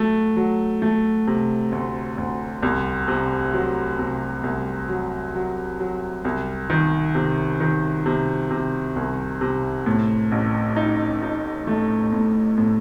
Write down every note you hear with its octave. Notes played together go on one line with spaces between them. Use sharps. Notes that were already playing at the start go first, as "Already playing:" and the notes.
Already playing: F#3 A3
F#3
A3
C3
D2
D2
C2
C3
F#3
C3
C2
F#3
F#3
F#3
C2
D#3
C3
D#3
C3
C3
C2
C3
A2
A1
D#4
D#4
A3
A2
A2